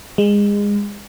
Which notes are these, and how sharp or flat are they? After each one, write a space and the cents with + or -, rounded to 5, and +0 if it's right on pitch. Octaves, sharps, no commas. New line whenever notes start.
G#3 -25